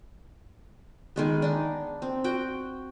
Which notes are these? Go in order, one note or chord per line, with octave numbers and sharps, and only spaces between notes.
D#3 G#3 B3
D4 D#4
C4
F#4 G5